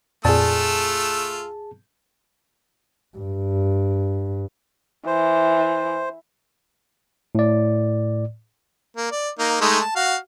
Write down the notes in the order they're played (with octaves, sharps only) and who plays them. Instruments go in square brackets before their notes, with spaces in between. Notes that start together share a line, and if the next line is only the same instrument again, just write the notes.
[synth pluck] F2 A#2 D5 [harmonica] A3 F4 E6 [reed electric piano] G#4 A5
[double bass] G2
[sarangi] E3 [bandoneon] C5
[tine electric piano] A2 D5
[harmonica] A#3
D5
A#3 D#4
G#3 A3 D#4
A5
F#4 F5